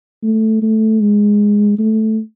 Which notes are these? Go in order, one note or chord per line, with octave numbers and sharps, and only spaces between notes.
A3
A3
G#3
A3